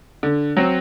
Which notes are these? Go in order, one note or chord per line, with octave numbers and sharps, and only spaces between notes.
D3
F#3 C4